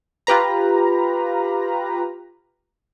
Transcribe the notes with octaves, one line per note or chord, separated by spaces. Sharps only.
F4 G4 B4 A#5